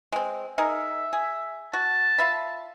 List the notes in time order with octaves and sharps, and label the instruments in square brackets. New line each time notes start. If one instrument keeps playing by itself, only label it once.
[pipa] G#3 C4
[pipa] D#4 G#4 A#4 [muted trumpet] E5
[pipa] G#4
[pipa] F#4 [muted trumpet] A5
[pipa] F4 E5 B5